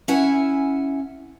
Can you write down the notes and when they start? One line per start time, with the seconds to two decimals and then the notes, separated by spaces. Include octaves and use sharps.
0.08 C#4 E4 E5 F#5 G#5